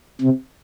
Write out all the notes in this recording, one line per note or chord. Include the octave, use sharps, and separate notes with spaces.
C3